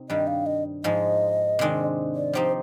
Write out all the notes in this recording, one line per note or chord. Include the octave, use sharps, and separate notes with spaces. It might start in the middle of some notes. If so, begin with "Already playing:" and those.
Already playing: C3 C4 D#4
G2 D#3 G3 D#5
F5
D#5
G#2 F3 G#3 D#5
C3 D#3 G#3 D4
D5
F3 C4 D#4 G4 C5